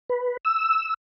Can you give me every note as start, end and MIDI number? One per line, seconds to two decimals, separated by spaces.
0.09 0.37 71
0.45 0.94 88